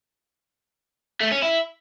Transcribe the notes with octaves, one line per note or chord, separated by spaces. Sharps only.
A3
C#4
E4